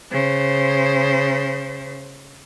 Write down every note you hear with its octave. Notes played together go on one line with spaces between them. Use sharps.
C#3 C5